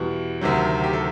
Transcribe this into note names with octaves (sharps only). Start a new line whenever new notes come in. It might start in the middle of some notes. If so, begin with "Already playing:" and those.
Already playing: E2 B2 G3
D2 C3 D#3 F#3
G4
A4